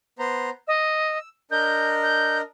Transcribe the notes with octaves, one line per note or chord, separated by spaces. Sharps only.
B3 C5 A#5
D#5 E6
D4 A#4 D#5 G6
G6